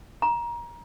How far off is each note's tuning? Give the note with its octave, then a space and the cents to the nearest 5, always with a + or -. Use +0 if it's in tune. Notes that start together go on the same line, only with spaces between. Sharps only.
A#5 +25